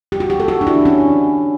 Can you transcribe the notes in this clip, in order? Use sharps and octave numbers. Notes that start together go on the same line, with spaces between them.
G4
F#4
G4
A4
F#4
D4
E4
C#4